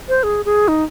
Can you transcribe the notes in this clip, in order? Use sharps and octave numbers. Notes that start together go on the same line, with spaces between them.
C5
G#4
G#4
D#4